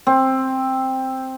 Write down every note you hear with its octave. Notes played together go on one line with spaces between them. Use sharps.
C4